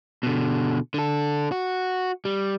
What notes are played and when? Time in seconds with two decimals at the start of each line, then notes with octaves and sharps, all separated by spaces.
0.23 B2 D3
0.94 D3 A4
1.52 F#4
2.25 G3